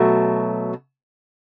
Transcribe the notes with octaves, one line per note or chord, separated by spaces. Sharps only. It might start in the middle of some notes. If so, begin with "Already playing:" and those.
Already playing: B2 F#3 A3 F#4